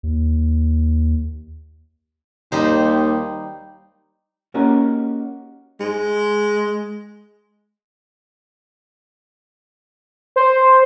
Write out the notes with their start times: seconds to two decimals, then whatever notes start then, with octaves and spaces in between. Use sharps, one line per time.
0.03 D#2
2.52 D#2 G3 D#4 C5
4.54 A#3 C#4 D#4 F#4 G4 A#4
5.80 G#3
10.36 C5